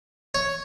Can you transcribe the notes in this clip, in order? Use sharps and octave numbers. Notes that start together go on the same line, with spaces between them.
C#5